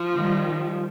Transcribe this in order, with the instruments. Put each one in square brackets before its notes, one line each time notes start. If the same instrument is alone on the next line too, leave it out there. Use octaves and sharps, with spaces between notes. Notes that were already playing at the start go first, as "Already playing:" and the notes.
Already playing: [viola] F3
[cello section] D#3 G3